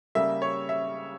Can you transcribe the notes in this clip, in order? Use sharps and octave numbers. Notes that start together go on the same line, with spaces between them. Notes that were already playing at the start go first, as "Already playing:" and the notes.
C#3 G3 A#3 E5
C#5
E5